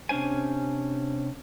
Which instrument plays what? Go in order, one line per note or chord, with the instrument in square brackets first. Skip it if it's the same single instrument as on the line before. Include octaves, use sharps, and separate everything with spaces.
[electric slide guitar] C3 C#4 D4 C5 G#5